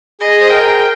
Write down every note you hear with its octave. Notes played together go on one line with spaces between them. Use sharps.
G#4 D#5
C5
A#4 G5
G#4
A#4